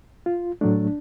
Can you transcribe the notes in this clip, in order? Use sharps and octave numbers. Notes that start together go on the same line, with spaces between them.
F4
A2 F#3 A3 D4